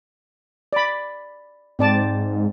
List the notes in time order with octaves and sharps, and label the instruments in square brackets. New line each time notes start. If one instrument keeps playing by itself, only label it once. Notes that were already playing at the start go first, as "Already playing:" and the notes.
[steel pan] D5 B5
[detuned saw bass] G#2 [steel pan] C4 D5 A5